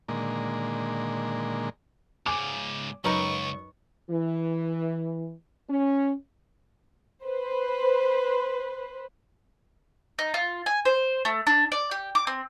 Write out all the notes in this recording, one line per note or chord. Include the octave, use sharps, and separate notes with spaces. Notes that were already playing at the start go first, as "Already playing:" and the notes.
A#2 D3 D#3 G#3 A#3
G#2 C#3 G#5 D6 F7
C#2 F#2 D#4 A#4 B4 C#6
E3
C#4
B4 C5
D#4
F4
G#5
C5
A3
D4
D5
G4
D6
C4